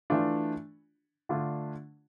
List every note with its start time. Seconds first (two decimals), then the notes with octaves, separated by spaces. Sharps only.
0.10 E3 A3 D4 F4
1.29 D3 A3 D4 F4